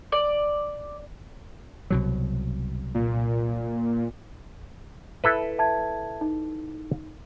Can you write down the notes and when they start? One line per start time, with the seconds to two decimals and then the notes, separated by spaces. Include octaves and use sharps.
0.12 D5
1.90 C2 B2 F#3
2.94 A#2
5.24 E4 A4 B4 E5
5.58 E5 A5 G#6
6.21 D#4